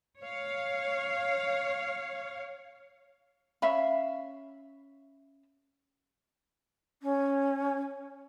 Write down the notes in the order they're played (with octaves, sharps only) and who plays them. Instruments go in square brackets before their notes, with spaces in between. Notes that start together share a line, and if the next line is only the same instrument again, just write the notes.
[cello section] C#5 F5
[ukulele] C#4 E5 F5 B5
[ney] C#4